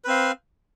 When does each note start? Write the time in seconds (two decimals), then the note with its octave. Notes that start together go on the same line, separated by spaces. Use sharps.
0.04 B4
0.07 C4
0.10 F5